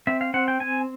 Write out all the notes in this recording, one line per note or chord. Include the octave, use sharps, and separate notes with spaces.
C4 E5
F5
C4 F#5
G5
C4 G#5